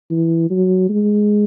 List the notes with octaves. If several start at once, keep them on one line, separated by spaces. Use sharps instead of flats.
E3
F#3
G#3